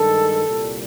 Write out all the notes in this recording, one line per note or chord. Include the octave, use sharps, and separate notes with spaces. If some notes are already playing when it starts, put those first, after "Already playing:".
Already playing: G2 D#3 G#3 A4
C2 A#2 G3